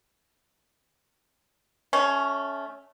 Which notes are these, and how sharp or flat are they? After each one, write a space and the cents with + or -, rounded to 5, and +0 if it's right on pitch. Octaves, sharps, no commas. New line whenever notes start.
A3 -10 C#4 +10